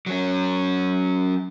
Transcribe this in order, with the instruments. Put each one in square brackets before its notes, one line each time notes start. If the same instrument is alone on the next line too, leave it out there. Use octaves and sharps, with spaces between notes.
[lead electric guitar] F#3 C#4